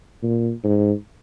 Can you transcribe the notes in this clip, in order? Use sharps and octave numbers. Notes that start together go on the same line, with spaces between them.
A#2
G#2